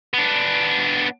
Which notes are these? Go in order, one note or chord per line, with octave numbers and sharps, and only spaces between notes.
B3 D4